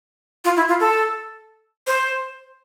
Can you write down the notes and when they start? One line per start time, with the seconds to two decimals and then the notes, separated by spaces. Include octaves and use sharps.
0.45 F4
0.57 E4
0.68 F4
0.80 A4
1.87 C5